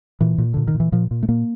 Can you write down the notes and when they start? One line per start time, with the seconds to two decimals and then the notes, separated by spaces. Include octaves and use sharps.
0.21 A#2 E3
0.38 A#2
0.54 A#2 D3
0.68 D#3
0.75 A#2
0.80 E3
0.92 A#2 F3
1.11 A#2
1.23 A3
1.28 A#2 A#3